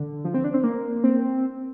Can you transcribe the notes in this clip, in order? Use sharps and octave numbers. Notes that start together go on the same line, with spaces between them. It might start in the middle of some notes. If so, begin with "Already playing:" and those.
Already playing: D3
F3
C4
D4
C4
A#3
C4